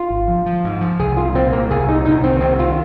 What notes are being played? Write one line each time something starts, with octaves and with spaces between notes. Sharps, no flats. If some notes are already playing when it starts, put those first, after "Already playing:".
Already playing: F4
G#1
F3
F3
G#2
F3
C2 G#4
C2 F4
A#2 C4
C2 A#3
C2 G#4
A#2 D#4
C2 D#4
D#3 C4
C2 C4
D#3 F4